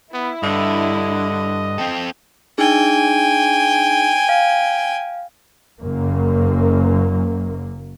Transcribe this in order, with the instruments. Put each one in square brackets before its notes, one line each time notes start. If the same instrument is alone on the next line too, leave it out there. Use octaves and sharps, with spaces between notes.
[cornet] B3 [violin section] E4
[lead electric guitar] G2 [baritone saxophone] D3 [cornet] D#5
[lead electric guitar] C4 A4 [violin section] G5
[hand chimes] D4 D#4 G#4 [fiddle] G5 G#5
[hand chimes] F5
[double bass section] F#1 F#2 A#3